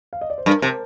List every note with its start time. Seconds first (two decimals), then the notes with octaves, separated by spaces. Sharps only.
0.13 F5
0.21 D#5
0.30 D5
0.38 C5
0.46 G2 A#4
0.62 C3 A5